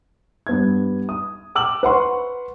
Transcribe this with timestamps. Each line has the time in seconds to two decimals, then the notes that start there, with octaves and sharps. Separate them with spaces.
0.47 G2 B3 G#6
1.09 D#6
1.55 G5 D6 E6 F6 F#7
1.83 B4 F#5 C6 C#6